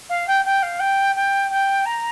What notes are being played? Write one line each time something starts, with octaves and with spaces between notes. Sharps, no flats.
F5
G5
G5
F5
G5
G5
G5
A#5